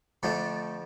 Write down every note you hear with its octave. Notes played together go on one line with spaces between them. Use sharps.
F2 D3 F3 A3